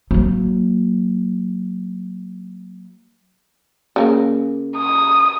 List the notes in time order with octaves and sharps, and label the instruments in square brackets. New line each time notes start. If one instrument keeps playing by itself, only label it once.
[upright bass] F#3 A#3
[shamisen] C#3 G3 A#3
[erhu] D#6